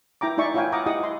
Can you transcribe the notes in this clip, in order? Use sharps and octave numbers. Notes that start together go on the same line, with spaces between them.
E4 G5 A#5 D6
D#4 E4 D5 E5 G#5 C#6
E4 F4 C#5 F5 G5 G#5
F#5 A#5 D6 D#6
E4 G4 D#5 F#5 D#6
C6